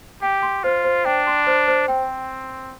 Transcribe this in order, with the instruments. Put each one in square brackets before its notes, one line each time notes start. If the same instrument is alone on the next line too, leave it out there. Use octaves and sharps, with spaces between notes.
[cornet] G4 [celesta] G5
[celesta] C6
[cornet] F4 [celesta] C5
[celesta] C5
[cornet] D4 [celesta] G5
[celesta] C6
C5
C5
[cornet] C4 [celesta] G5